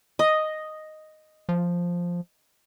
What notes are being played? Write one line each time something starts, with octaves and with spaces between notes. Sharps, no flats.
D#5
F3